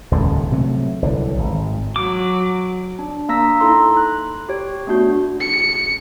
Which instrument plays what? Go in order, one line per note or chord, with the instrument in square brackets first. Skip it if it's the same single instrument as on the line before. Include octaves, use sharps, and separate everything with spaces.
[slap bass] D#1 C#2 G#2 D3
C3 F#3 A3
C2 D3 E3 F#3
G#1
[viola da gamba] F#3 [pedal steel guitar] D6
[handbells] D4
A#3 A#5 E6 A#6 B6
D#4 E4 A4 A#5 C6
F#6
G4 C#5
A3 B3 D4 F#4 G6
[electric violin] C#7